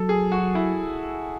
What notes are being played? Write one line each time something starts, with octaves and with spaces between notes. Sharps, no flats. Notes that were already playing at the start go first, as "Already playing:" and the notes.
Already playing: F#3 A4
G#4
F#4
E4